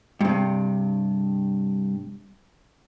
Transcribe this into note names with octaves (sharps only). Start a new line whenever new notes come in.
G2 C3